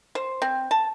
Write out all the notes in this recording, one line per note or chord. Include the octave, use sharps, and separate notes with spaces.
C5
C4
A5